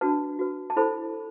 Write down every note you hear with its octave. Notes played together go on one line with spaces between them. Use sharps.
D4 F#4 B4 A5
F#4 B4
A5
E4 A4 C5 B5